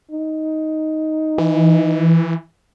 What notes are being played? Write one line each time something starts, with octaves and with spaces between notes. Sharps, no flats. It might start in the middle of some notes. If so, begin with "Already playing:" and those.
D#4
E3